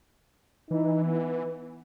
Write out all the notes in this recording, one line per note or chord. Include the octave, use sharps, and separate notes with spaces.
E3 D#4
B3